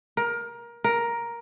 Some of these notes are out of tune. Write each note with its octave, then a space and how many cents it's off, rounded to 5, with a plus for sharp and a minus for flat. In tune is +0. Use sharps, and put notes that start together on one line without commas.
A#4 +20
A#4 +10